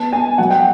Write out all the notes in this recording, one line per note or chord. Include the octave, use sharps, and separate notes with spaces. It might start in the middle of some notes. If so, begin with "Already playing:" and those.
Already playing: B3 A5
B3 G#5
F#3 F#5
G5